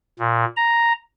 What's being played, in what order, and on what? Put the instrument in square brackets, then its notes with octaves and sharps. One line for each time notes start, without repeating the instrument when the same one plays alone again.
[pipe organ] A#2
A#5